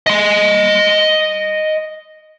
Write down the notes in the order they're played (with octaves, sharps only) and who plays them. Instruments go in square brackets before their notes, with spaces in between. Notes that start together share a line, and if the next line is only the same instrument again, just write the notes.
[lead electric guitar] D#5 C6